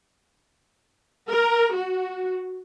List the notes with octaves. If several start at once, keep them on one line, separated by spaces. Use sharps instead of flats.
A#4
F#4